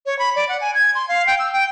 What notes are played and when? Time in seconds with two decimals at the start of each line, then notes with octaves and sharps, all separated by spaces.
0.06 C#5
0.19 B5
0.36 D5
0.49 F#5
0.61 G#5
0.75 G#6
0.95 C6
1.08 F5
1.27 G5
1.39 E6
1.53 G5